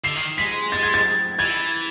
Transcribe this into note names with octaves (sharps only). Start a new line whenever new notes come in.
D3 C7
D#3
G#3 B6
A6
G#6
A6
E3 G#6